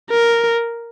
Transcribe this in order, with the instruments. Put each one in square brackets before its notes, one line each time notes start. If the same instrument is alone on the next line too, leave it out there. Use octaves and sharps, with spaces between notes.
[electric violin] A#4